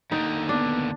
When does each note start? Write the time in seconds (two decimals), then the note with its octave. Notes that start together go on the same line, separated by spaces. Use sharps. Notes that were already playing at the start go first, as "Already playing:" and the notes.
0.12 D#2 D3 D#4
0.49 B3 D4